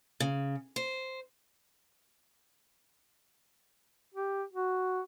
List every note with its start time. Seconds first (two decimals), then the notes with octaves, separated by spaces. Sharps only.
0.20 C#3
0.76 C5
4.14 G4
4.54 F#4